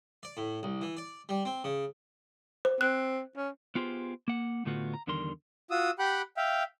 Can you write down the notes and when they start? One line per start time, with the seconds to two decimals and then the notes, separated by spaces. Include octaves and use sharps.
0.23 D5
0.37 A2
0.63 C2
0.82 E3
0.97 D5
1.29 G3
1.45 C4
1.64 C#3
2.65 C5
2.81 C4 F#6
3.37 C#4
3.75 B3 F4 G4 G#4 C5
4.28 A#3 F#5
4.65 A2 D3 A3 B3 F4 F#4
4.94 A#5
5.07 E2 D3 D#3 G3 A#4 C6
5.71 F4 F#4 D#6 E6
5.99 G4 F#5 G5 B5 F#6
6.37 E5 F5 G5